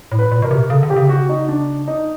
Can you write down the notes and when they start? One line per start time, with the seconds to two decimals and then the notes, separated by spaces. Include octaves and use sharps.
0.12 A2
0.19 B4
0.31 A#2
0.42 B2 A#4
0.51 C3
0.70 C#3 A4
0.83 D3
0.90 G4
0.96 C#3
1.09 F#4
1.29 D#4
1.49 D4
1.88 D#4